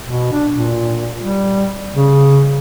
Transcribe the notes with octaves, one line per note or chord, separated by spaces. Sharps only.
B2
D4
A#2
G3
C#3